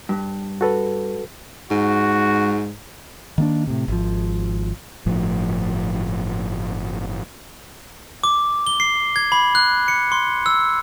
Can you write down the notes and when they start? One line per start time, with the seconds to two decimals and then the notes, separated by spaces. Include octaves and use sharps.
0.09 G2
0.61 F#4 A4 B4
1.71 G#2 F#4
3.38 D#3 A#3 D4
3.67 A2 C3
3.88 G#1 F3
5.06 G1 A2 F3
8.24 D6
8.67 G7
8.80 C7
9.16 G#6
9.32 B5
9.55 F#6
9.88 C#7
10.12 C6
10.46 E6